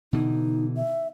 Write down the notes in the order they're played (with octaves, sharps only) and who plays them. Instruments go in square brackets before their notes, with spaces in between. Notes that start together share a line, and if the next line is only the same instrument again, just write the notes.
[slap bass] B2 D3 E3 [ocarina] D#4
[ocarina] E5